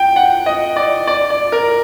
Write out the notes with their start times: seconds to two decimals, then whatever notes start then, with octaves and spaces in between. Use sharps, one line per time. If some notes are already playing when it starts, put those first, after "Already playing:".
Already playing: G5
0.16 F#5
0.46 D#5
0.76 D5
1.07 D5
1.30 D5
1.52 A#4